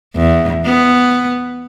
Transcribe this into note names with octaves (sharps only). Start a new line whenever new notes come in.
E2
B3